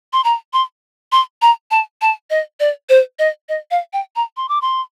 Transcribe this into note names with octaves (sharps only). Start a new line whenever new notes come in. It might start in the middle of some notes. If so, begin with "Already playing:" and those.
C6
A#5
C6
C6
A#5
A5
A5
D#5
D5
C5
D#5
D#5
F5
G5
A#5
C6
D6
C6